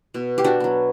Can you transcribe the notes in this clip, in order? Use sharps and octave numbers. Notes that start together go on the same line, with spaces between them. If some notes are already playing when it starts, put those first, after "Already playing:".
B2
G4
D4 F#4
F#3 B3